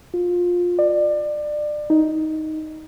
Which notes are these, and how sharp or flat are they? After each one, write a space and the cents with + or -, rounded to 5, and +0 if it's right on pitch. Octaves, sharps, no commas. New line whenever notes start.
F4 +15
D5 +25
D#4 +10